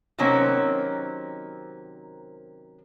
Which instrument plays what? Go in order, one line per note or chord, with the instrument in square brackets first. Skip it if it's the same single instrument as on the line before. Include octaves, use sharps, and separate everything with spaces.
[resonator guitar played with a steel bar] C3 D#3 F#3 A#3 C4 C#4